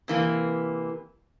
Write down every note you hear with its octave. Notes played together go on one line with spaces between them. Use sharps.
C3 E3 A#3